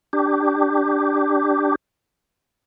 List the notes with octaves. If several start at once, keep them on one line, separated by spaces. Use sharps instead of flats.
D4 G4